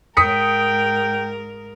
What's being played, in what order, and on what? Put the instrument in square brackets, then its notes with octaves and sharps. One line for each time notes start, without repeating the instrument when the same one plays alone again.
[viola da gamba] G#2 A#4 [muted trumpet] G5 [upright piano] D#6 B6 C#7